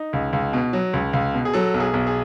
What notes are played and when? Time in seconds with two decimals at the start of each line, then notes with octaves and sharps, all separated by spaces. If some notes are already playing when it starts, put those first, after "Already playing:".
Already playing: D#4
0.13 C#2
0.33 C#2
0.53 B2
0.73 F#3
0.93 C#2
1.13 C#2
1.34 B2
1.45 G#4
1.53 F#3 A4
1.74 B1
1.80 G#4
1.94 B1
2.07 G#4